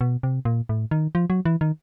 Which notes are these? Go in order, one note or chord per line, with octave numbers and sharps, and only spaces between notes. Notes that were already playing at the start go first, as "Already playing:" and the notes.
B2
C3
A#2
A2
D#3
F3
F#3
E3
D#3